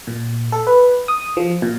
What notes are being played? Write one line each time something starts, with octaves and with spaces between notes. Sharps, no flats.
A#2
A4
B4
D#6
F3
A#2